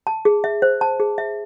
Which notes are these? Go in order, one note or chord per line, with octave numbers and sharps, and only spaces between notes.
A5
G#4
E5
C5
A5
G#4
E5